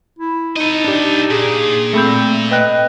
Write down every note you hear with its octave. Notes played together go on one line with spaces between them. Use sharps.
E4
D#4 A4 D#5
D4 G4
A#2 G#4
A3 C4 B5 G6
B4 D#5 G5 F#6